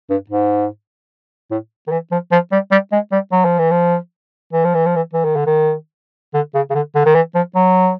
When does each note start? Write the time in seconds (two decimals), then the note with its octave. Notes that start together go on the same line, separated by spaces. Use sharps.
0.10 G2
0.30 G#2
1.51 A2
1.87 D#3
1.91 E3
2.11 F3
2.32 F3
2.52 G3
2.71 G3
2.93 G#3
3.12 G3
3.32 F#3
3.45 F3
3.59 E3
3.71 F3
4.53 E3
4.64 F3
4.74 E3
4.86 F3
4.96 E3
5.14 E3
5.24 D#3
5.36 D3
5.46 D#3
6.34 D3
6.55 C#3
6.70 C#3
6.75 D3
6.95 D3
7.06 D#3
7.15 E3
7.35 F3
7.55 F#3